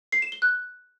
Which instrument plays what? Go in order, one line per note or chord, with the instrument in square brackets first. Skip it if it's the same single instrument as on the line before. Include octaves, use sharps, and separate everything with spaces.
[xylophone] C7
E7
G7
F#6